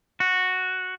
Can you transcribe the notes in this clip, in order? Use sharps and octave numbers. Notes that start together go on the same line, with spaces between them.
F#4